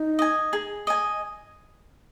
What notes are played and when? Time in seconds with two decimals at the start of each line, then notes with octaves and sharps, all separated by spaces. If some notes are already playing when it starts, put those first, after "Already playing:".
Already playing: D#4
0.19 D#5 G#5
0.53 G#4
0.87 D#5 G#5